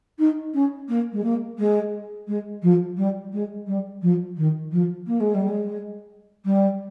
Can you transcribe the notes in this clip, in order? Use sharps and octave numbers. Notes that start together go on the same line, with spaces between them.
D#4
C#4
A#3
G#3
A#3
G#3
G#3
F3
G3
G#3
G3
F3
D#3
F3
A#3
G#3
G3
G#3
G3